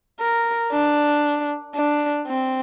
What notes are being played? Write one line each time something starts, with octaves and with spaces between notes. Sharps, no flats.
A#4
D4
D4
C4